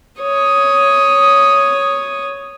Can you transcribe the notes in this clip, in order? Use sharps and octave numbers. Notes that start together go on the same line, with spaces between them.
C#5 D#6